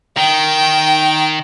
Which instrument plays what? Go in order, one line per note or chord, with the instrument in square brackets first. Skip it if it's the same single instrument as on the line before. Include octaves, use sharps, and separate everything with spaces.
[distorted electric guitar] D#3 [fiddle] G5